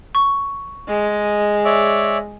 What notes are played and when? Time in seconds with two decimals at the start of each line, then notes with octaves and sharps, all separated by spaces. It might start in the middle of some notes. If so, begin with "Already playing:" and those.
0.15 C#6
0.87 G#3
1.65 C#5 D5 E5